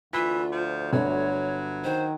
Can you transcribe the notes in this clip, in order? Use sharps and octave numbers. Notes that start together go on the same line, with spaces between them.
D2 E3 F4 B6
F3
G1 F#3 C#5
D#3 C5